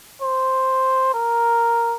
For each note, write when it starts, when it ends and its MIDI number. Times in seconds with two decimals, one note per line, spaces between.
0.22 1.13 72
1.14 1.97 70